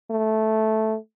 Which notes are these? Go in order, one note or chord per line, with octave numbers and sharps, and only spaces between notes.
A3